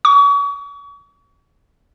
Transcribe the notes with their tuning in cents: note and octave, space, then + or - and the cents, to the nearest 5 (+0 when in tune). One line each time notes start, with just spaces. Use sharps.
C#6 +40